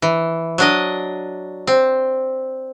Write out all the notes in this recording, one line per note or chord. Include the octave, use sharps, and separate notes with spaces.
E3
F#3 D4 D#5
C4